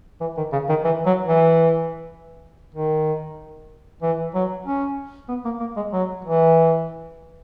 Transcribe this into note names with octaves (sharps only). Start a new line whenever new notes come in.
E3
D#3
C#3
D#3
E3
F#3
E3
D#3
E3
F#3
C#4
B3
A#3
A#3
G#3
F#3
E3